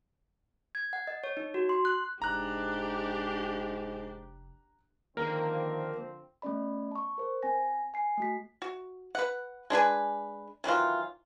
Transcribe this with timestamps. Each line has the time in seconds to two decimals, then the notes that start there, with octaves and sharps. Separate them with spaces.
0.75 G#6
0.93 F#5
1.07 D#5
1.24 C#5
1.37 D#4
1.54 F#4
1.69 C6
1.85 F#6
2.22 F1 G#2 D4 G4 A#5 F#6
5.17 D3 D#3 F3 A#3 C4 A#4
6.42 A3 B3 C#4 D5 B5
6.91 A5 C#6
7.18 A#4 C5
7.42 C4 G5 G#5 A#6
7.94 G#5 C7
8.18 A3 F#4 B6
8.62 F#4
9.15 B4 F#5
9.70 G#3 D4 B4 G#5
10.64 D#3 E3 F#3 F4